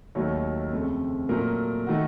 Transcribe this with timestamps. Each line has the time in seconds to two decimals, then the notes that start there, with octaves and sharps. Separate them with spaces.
0.15 D#2 D#3 F#3 A3 C#5
0.73 F2 C#3 A3
1.29 A#2 F#3 A3 A#4
1.87 D#3 A3 F#4